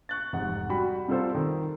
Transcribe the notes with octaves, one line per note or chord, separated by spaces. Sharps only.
C#6 F#6 A6
F1 G#2 F#5
G3 F#4 G5 B5
C3 G3 F4 A4 C5
D#3